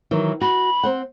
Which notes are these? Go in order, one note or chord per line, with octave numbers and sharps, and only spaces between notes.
D#3 E3 F#3
F#4 B5
C4 C5 F#5